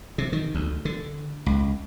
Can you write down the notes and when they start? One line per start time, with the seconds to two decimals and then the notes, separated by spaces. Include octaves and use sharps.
0.18 C3
0.33 D#3
0.55 D2
0.85 D3
1.46 C#2